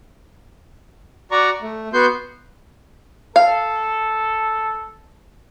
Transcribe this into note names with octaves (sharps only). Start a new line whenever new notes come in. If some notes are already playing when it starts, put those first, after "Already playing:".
F#4 D5 A#5 C#6
A3
B3 F#4 C6 G6
A4 F5